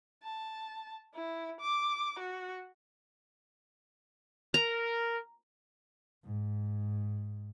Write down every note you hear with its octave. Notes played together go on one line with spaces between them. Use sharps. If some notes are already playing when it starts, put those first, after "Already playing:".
A5
E4
D6
F#4
A#4 A#5
G#2